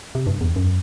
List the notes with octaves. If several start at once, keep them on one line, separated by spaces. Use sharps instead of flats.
C3
G2
E2
F#2